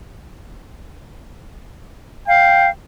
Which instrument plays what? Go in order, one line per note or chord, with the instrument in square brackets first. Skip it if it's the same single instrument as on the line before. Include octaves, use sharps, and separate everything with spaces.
[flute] F5 [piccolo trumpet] G5